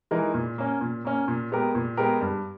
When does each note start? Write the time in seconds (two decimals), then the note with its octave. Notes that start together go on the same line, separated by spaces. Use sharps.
0.11 E3 G#3 D#4 A#4
0.34 A#2
0.58 A#3 C#4
0.81 A#2
1.05 A#3 C#4
1.28 A#2
1.52 G#3 B3 G4 A#4
1.75 A#2
1.97 G#3 B3 G4 A#4
2.21 G2